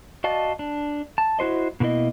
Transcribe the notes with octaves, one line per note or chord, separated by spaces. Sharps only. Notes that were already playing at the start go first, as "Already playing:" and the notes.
F#4 D5 D#5 F5 A5
D4
A5
E4 F#4 C5 D#5
B2 D3 A#3 E4 D#5